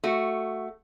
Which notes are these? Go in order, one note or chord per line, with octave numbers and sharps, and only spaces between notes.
A3 F#4